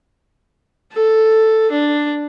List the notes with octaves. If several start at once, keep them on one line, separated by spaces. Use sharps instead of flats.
A4
D4